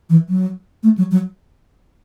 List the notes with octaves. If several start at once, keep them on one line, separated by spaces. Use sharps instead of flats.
E3
F#3
A3
F#3
F#3